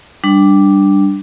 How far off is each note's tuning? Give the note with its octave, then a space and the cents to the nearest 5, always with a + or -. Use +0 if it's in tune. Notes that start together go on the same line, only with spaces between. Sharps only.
G3 +0 D4 +0